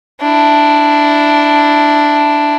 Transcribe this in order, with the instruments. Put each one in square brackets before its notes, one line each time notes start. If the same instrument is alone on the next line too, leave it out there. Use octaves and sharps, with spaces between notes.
[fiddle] D4 E4